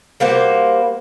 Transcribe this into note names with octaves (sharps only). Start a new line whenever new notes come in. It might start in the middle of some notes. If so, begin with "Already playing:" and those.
G3 A#3 F#4 C5